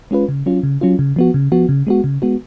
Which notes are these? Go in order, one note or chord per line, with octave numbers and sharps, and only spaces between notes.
G#3 C#4 F4 B4
C#3
F#3 C#4 F4
C#3
F#3 C#4 F4
C#3
F3 B3 F#4
C#3
F3 B3 F#4
C#3
G#3 B3 F#4
C#3
G#3 B3 F#4